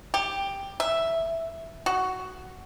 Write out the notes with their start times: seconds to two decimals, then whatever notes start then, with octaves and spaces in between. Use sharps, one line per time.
0.14 G4
0.80 E5
1.86 F#4